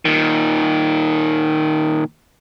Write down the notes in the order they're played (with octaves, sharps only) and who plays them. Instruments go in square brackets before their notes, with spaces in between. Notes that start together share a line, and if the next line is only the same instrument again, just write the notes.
[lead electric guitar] A#2 D#3